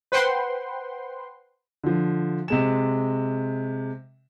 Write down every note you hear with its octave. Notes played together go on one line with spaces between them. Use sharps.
B4 C5 F#5 G5 C6
D3 F3
C3 G#3 E7